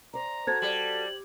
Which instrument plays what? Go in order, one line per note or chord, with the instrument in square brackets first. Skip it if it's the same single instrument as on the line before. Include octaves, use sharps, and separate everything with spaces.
[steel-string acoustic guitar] C5 D5 [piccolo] A#5
[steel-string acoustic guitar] F#4 A4 [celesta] C5 G#6 A6
[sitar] G3 [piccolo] F#7